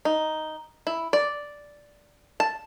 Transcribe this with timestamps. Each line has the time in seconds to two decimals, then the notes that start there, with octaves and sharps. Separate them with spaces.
0.05 D#4
0.87 E4
1.13 D5
2.40 A5